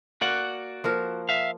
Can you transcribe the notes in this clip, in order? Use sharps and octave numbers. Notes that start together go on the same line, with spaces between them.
A#3 F#4 D5 F#5
F3 A#3 A#4
E5 F5